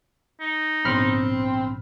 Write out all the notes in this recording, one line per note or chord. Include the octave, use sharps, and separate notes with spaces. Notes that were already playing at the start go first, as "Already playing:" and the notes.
D#4
A#1 G#2 C#3 B3 C4 B5 F6